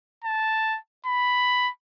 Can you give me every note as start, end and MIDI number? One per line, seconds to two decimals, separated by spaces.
0.24 0.78 81
1.06 1.70 83